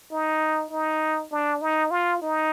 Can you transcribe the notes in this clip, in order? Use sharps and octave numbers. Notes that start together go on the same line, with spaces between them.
D#4
D#4
D4
D#4
F4
D#4